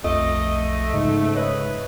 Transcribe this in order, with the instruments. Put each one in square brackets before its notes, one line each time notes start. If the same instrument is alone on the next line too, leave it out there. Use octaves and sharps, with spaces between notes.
[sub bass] B1 [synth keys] F2 [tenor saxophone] A3 [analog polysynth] D#5
[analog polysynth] G#2 [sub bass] C#3
[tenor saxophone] B4 [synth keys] C#5 D#5 E5